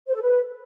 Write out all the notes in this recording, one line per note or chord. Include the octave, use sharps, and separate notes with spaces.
C5
A4
B4